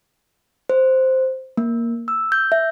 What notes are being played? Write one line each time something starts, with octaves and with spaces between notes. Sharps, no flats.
C5
A#3
E6
G6
E5